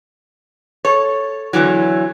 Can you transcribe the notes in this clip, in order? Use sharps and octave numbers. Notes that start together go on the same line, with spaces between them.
A4 C#5
E2 B2 D3 E3 F#3